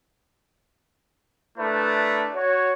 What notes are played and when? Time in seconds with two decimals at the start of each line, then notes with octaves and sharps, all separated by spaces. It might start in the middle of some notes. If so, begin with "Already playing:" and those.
1.58 A3 D4 E4 A#4 B4 D5
2.34 F#4 C#5